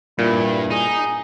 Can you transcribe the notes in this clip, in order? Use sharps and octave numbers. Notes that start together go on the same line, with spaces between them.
G2 A#2 E4
D#4 G#4